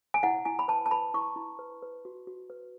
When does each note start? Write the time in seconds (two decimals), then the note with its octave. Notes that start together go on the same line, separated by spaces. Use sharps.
0.14 G#5
0.23 E4 F#5
0.45 E4 G#5
0.59 B5
0.68 B4 A5
0.86 A5
0.91 B4 B5
1.14 E4 C#6
1.36 E4
1.59 B4
1.82 B4
2.05 F#4
2.27 F#4
2.50 B4